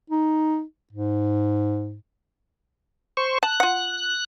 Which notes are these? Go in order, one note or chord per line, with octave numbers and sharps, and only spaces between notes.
D#4
G#2
C5 C#6
A5 F#6
F4 F#5